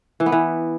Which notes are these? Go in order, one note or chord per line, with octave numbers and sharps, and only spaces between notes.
E3
B3
E3